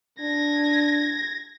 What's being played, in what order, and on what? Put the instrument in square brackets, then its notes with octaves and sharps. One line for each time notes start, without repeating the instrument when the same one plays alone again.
[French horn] D4 [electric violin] G#6 A#6